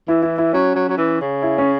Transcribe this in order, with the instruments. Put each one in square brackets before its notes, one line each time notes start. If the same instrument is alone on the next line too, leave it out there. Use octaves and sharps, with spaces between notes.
[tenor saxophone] E3 [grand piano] E4
[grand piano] E4
E4
[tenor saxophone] F#3 [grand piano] C#4
[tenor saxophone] F#3
F#3
E3
C#3
[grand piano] E4
C#4